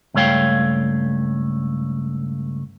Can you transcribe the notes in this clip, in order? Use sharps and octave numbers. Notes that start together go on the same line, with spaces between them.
C#2 G2 A3 C#5 F5 G5